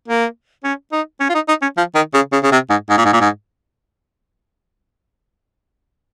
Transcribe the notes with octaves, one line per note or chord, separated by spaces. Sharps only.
A#3
C#4
D#4
C#4
F4
D#4
D#4
C#4
F3
D#3
C#3
C#3
C#3
C3
G#2
G#2
A#2
G#2
A#2
G#2